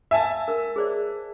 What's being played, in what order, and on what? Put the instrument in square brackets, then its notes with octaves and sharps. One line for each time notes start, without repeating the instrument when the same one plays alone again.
[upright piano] E5 G#5 A5
[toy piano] A#4 E6
G#4 C5 D5